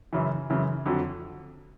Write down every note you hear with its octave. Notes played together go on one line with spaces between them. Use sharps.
F#2 C#3 E3
F#2 C#3 E3
F2 D3 F#3